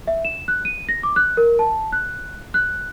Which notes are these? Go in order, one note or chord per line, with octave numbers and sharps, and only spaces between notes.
E5
E7
F#6
D#7
A#6
D6
F#6
A#4
A5
F#6
F#6